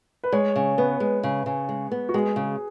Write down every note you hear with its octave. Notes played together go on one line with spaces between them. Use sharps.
B4
G#3 C#5
C#3
B3 B4
G#3
C#3
C#3
G#3
B3
F#4
G#3 G#4
C#3